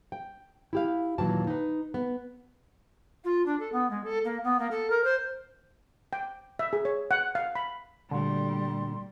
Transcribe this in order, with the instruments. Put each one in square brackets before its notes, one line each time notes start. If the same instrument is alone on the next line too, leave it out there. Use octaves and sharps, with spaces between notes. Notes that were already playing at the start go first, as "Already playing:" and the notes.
[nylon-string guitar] G5
E4 G4 F5
D#2 A#2 D#3 E3 F#3 A5
D#4 B4
B3
[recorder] F4
D4
A4
B3
G#3
A4
A#3
B3
A#3
A4
A#4
C5
[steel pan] G5
E5
G#4
C#5
F#5
F5
B5
[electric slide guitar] A#2 A3 F#4 [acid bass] D3 [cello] G3 [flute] C6